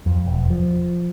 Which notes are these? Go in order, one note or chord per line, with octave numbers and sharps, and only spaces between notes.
F2
E1
F3